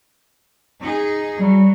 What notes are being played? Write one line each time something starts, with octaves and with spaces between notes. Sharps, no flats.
D#4 G#4
F#3 G3